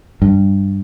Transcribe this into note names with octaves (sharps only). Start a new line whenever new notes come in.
G2